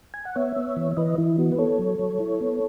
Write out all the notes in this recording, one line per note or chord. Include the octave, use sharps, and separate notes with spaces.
G#5
F#5
B3 C#5 E5
B3
E3
E3 B4 D#5
E3 E4
B3 F#4
B4
B3 A4 C#5
F#3
F#3
E4
B3